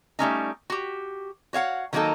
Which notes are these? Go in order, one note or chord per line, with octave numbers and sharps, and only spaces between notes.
G3 A3 C#4 D#4
F#4 G4
F#4 C#5 F5 F#5
D#3 F#3 A#3 C4 D#4 A4